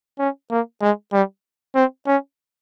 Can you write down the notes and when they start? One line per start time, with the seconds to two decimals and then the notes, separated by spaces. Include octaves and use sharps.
0.19 C#4
0.51 A#3
0.82 G#3
1.12 G3
1.75 C4
2.07 C#4